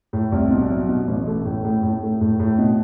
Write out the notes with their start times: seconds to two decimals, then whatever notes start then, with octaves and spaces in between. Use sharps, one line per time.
0.13 A2
0.32 C2
0.51 B2
0.69 F#3
0.89 B2
1.08 A1
1.27 A3
1.45 A2
1.65 A2
1.83 A2
2.02 A3
2.21 A2
2.39 A2
2.58 B2